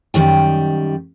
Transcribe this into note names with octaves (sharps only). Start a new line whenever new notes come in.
F#2 D#3 G3 G5